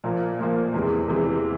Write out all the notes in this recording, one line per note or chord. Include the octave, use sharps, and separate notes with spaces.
A#2 F3 A#3
A#2 F3 A#3
E2 C3 E3 G#3
E2 C3 E3 G#3